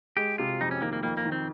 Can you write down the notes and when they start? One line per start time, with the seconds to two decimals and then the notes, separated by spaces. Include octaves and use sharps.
0.17 G#3 G4
0.38 C3 F4
0.61 F2 D#4
0.71 C#4
0.81 D#3 A#3
0.93 A#3
1.03 F2 A#3
1.17 A#3
1.25 D#3
1.32 C4